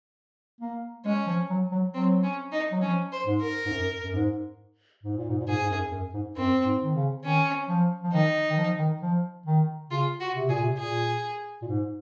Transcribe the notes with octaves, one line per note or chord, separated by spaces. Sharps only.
A#3
G#3 C#4
F3
F#3
F#3
F#3 C4
C#4
D#4
F#3
F3 C#4
C5
G#2
A#4
G#2
F#2
F#2
G#2
G#2
A#2
G#2
A#2
G#2 G#4
G#2
F#2
F#2
G#2
F#2 C4
G#2
D#3
C#3
D#3 C#4
F3
F3
D#3 D#4
D#3
F3
D#3
F3
D#3
C#3 F4
F#4
C3
A#2 G#4
C3
A#2 G#4
A#2
G#2